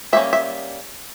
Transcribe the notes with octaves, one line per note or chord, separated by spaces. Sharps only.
G3 A#3 C#4 E5
E5